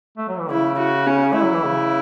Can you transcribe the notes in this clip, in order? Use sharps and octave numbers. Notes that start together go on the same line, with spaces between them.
A3
F#3
E3
C#3 E4
F#4
C#4
A3 E4
F#3
E3
C#3